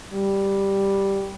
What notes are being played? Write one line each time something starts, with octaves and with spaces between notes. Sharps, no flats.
G3